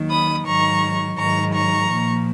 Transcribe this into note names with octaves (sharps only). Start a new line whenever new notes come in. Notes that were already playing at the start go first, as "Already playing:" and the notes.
Already playing: D#2 D#3 F#3
B5 D#6
G#2 D#3 F#3 A#5 C#6
G#2 D#3 F#3 A#5 C#6
A#5 C#6
A#2 F3